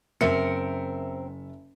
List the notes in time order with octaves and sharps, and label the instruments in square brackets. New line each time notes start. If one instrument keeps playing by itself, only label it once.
[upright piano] F#1 E5 C#7 [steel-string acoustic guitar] C4 A#4